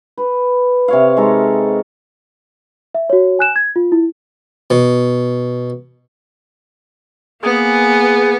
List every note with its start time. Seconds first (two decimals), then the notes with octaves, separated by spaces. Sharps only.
0.18 B4
0.88 C3 C#5 F5
1.17 G#3 D#4 A4
2.95 E5
3.10 F#4 C#5
3.39 G#5 F#6 E7
3.56 G#6
3.76 F4
3.92 E4
4.70 B2
7.43 A#3 B3 G#4